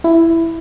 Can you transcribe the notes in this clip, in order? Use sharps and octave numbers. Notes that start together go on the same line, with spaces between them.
E4